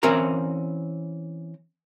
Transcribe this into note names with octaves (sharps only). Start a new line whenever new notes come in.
E3 C4 C#4 A#4 A#5